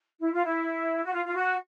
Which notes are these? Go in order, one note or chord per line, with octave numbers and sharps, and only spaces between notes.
E4
F4
E4
F#4
F4
F4
F#4